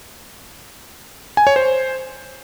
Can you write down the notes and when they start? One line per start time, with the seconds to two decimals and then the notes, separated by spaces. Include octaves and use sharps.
1.37 G#5
1.47 C#5
1.56 C5